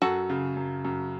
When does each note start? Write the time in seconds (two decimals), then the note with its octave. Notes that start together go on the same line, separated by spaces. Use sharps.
0.02 F#2 F#4 A4
0.30 C#3
0.57 F#2
0.85 F#2